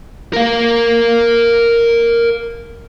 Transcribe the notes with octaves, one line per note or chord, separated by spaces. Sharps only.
A#4 F5